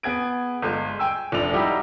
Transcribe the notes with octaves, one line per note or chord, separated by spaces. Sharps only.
B3 G#4 G#6 D7
G1 G#3
G5 G#5 E6
F1 D4 F7
G3 G#3 D#4 E4 F#4 G4